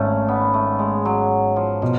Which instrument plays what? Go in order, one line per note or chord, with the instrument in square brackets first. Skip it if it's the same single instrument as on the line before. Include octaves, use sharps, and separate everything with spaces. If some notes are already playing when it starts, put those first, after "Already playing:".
Already playing: [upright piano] G#1 G#2 [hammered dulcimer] A3 C#4
[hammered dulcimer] B3
A3
G#3
F#3
F3
[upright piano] B2 [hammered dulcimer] F3